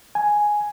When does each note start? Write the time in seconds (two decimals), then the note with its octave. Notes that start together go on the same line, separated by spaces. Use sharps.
0.15 G#5